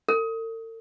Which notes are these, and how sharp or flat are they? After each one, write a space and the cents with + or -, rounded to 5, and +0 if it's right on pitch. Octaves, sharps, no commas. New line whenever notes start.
A4 +45